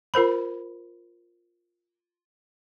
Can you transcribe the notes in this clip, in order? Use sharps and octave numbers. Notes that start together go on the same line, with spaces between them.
F4 A#4 C5 B5